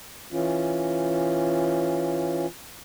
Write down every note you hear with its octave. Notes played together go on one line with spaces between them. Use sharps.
E3 C#4 F4